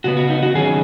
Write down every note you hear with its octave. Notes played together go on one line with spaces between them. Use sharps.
C#3 B3 F#4
F#4
D#4
F#4
D#3 F#3 C#4 G#4